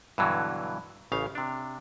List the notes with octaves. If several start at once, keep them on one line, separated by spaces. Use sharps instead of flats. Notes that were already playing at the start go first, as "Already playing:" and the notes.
G2 B2 D3 E3 F#3
A1 C#3 F5
C3 D4